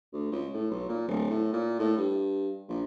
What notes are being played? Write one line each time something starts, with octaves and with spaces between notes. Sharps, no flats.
D2
C#2
A2
B1
A#2
D1
A2
A#2
A2
G2
A#1